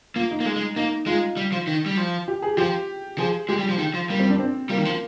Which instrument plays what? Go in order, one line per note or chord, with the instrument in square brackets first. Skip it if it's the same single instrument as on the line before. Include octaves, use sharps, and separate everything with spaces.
[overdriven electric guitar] A#3 [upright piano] F4
[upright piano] D#4
[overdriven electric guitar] A#3
G#3
G#3
[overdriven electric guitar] A#3 [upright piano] D#4
[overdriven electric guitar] G#3 [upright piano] F4
[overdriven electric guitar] G3
F3
D#3
G3
F3
[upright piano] G4
G#4
[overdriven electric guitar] F3 [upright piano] G4
[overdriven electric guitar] F3 [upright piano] G#4
[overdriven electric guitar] G#3 [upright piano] G4
[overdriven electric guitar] G3
F3
D#3
F3
[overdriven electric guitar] G3 [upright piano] A#3
[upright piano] C4
D4
C4
[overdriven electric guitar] G3 [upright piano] A#3
[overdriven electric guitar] D#3
F3